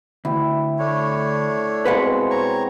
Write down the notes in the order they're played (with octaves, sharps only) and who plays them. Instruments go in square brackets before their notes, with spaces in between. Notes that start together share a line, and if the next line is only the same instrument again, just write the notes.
[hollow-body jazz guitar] D2 [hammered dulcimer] E4 G5
[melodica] A3 D4 C#5
[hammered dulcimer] B2 G#3 C4 [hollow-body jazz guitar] B4 F5 F#5
[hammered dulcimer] C4 [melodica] C#5 A#5 C#6